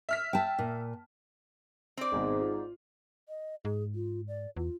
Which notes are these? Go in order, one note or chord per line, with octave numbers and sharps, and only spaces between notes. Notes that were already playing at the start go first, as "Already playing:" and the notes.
E5 F6 B6
G5 A5
A#2
C4 D5
G#1 G#2 B2
F4
D#5
G#2 G#4
F4
D5
E2 F4